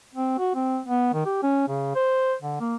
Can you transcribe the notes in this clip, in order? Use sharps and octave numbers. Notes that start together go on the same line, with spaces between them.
C4
F#4
C4
B3
D#3
G4
C#4
C#3
C5
D3
A#3